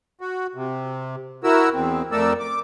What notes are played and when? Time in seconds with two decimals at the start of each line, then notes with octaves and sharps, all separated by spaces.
0.21 F#4
0.55 C3
1.44 E4 F#4 A#4 E6
1.74 E2 C4
2.12 F2 A3 A4 A#4 D5 E6
2.40 D6